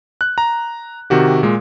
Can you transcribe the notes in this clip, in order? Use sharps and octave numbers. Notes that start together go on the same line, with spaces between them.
F#6
A#5
C3 D#3 F#4 G4
A#2 G#3